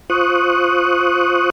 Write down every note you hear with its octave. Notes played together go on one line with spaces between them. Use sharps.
F4 C5 C#6 D#6 F#6